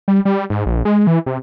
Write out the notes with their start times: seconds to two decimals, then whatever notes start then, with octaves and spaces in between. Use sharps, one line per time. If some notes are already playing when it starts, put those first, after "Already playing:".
0.08 G3
0.25 G3
0.50 G#2
0.66 A#1
0.85 G#3
1.07 E3
1.26 C3